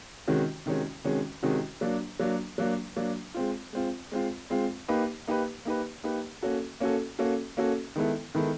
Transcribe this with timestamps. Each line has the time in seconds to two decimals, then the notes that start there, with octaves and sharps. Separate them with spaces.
0.27 C3 D#3 G#3 C#4 F#4
0.66 C3 D#3 G#3 C#4 F#4
1.04 C3 D#3 G#3 C#4 F#4
1.43 C3 D#3 G#3 C#4 F#4
1.81 F#3 A#3 D4
2.19 F#3 A#3 D4
2.58 F#3 A#3 D4
2.96 F#3 A#3 D4
3.34 G#3 C4 F4
3.73 G#3 C4 F4
4.12 G#3 C4 F4
4.50 G#3 C4 F4
4.88 A#3 D#4 G4 B4
5.27 A#3 D#4 G4 B4
5.65 A#3 D#4 G4 B4
6.04 A#3 D#4 G4 B4
6.42 A#3 C#4 F#4 A4
6.80 A#3 C#4 F#4 A4
7.19 A#3 C#4 F#4 A4
7.57 A#3 C#4 F#4 A4
7.96 D#3 G#3 B3 E4 A4
8.35 D#3 G#3 B3 E4 A4